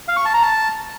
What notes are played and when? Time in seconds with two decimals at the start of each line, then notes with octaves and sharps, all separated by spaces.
0.08 F5
0.17 C#6
0.25 A5
0.34 A#5
0.43 A5